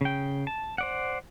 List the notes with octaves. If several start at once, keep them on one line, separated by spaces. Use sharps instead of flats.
C#3 G5
A5
C5 D5 F#5